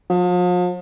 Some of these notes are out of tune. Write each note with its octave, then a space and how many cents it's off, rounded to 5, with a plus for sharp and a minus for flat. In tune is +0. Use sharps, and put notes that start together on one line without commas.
F3 +40